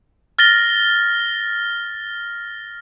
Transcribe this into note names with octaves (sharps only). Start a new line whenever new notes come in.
F6 A6 A#6 G7